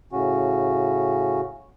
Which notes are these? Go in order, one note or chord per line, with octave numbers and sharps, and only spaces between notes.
A2 C#3 C#4 F#4